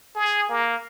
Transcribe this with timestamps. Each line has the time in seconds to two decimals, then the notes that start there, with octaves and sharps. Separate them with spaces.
0.15 G#4
0.49 A#3